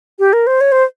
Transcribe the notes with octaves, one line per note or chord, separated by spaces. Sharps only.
G4
A#4
C5
C#5
C5